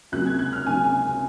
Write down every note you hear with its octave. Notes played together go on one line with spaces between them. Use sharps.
C#2 C3 F#3 A#3 C#4 F#6
G#6
F#6
F6
C#2 C3 F#3 A#3 C#4 G#5